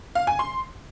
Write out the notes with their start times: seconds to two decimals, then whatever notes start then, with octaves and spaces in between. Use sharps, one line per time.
0.15 F5
0.27 G#5
0.39 C6